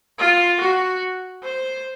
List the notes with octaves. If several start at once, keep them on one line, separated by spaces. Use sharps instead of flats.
F4
F#4
C5